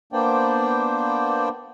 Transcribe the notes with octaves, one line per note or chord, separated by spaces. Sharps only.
A#3 B3 D4 C5 D5 G5